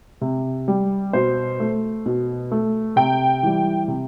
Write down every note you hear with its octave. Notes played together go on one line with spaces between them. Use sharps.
C3
G3
B2 C5
A3
B2
A3
C3 G5
E3 G3
C3